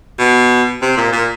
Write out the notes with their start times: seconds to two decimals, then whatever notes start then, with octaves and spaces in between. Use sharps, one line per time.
0.19 B2
0.82 C3
0.97 A#2
1.12 A#2